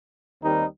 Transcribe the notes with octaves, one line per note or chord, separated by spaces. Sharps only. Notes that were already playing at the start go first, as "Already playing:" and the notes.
D#2 D#3 G3 C4 D#4